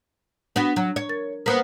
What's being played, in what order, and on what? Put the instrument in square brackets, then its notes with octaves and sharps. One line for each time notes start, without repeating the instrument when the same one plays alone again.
[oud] B3 F#4 [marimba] D4
[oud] F#3
C#5
[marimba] A#4 A6
[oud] A#3 B3 [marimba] B4 C5